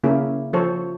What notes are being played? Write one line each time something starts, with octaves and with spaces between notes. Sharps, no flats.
C#3 A#3 C#4 E4 G#4
F3 A4 C5 C#5